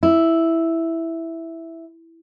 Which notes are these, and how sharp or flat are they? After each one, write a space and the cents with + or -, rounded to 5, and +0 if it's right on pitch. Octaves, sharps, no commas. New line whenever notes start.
E4 +0